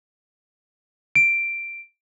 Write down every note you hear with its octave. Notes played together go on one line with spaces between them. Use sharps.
D7